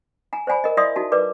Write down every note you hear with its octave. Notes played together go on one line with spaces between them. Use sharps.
G#5 A#5
C5 D5 G#5 B5
A#4 D#5
E4 D5 E5 C6 D#6
D#4 F#4 A5
A#4 B4 D5 D6